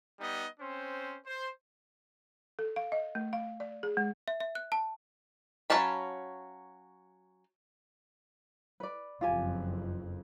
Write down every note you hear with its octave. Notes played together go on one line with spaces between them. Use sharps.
G3 B3 D#4 D#5
C4 C#4 C5
C5
A4
F5
D#5
A3
F5
D5
G#4
G#3
E5
E5
F#6
A5
F#3 C#4 F5 A5 B5
B4 D5
F#1 F2 F4 G4 G#5